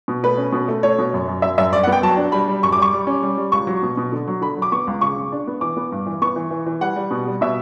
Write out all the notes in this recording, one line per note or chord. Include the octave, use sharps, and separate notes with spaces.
B2
A3 B4
C#4
B2
A3
A3 C#5
B2
F#2
F#2
F#2 E5
F#2 E5
G2 D5
F#5
B3
G5
F#3 A5
D4
G3 B5
G3
F#2 C#6
D6
G3 C#6
G3
C#4
G3
G3
C#2 C#6
F#3
B2
B2
D3
F#3
D3 B5
F#3
D6
B3 C#6
C#2
C#3 C#6
C#3
D4
B3
E3 D6
B3
G2
E3
B3 C#6
E3
E3
E3
G3 F#5
G3
B2
G3
B2 E5